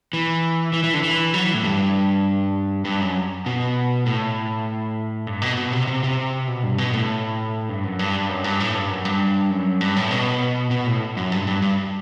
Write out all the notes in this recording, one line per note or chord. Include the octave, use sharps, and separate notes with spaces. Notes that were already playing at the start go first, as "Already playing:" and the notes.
E3
E3
E3
D3
E3
F#3
E3
A2
G2
G2
F#2
B2
A2
G2
B2
B2
C3
C3
C3
B2
G2
B2
A2
G2
F#2
G2
F#2
G2
A2
G2
F#2
G2
F#2
G2
A2
B2
B2
A2
F#2
G2
G2
G2